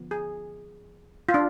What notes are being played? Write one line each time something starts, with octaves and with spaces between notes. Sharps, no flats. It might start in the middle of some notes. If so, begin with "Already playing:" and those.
Already playing: D3 F3 B3
G#4
F4
D4